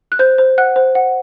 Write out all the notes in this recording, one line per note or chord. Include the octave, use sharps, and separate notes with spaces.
F#6
C5 G6
C5
F#5 F#6
C5
F#5